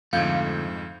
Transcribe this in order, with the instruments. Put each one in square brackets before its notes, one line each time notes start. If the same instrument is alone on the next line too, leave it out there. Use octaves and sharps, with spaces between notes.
[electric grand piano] F2 G#2 [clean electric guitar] D3 F3 A3 [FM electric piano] F5 G6 G#6